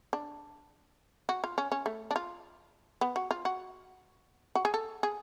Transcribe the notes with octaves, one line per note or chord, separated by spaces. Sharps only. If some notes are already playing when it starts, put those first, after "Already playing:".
D4
F#4
F4
C#4
C#4
A3
D4
F4
B3
F#4
F4
F#4
F#4
G#4
A4
G#4